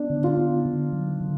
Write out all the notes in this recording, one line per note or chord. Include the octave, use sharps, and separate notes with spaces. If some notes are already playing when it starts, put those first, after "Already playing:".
Already playing: B3 D4
D3
F4
B3
D3
F#3
D3